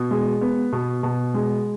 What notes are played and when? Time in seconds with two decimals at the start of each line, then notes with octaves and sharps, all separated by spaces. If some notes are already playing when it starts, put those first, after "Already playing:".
Already playing: B2
0.11 G#3
0.41 B3
0.72 B2
1.03 B2
1.34 G#3